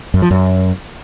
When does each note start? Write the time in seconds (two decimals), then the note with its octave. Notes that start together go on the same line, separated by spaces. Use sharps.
0.14 F#2
0.22 F3
0.31 F#2